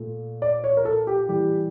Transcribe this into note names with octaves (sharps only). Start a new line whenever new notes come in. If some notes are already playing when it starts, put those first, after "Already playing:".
Already playing: A#2 A3
D5
C#5
A#4
A4
G4
A2 E3 G3 G4